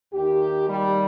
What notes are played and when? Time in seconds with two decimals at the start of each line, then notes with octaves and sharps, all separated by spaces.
0.14 D#2 D#3 G4
0.69 G3